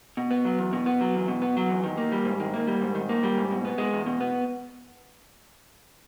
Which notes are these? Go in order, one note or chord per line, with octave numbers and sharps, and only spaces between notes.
B2
B3
F#3
E2
B2
B3
F#3
E2
B2
B3
F#3
E2
D#3
A#3
G3
G#2
D#3
A#3
G3
G#2
D#3
A#3
G3
G#2
B2
B3
G#3
E2
B2
B3